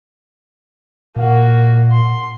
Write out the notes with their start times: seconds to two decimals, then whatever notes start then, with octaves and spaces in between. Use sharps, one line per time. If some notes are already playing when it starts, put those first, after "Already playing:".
1.16 A#2 A#3 F#4
1.92 C6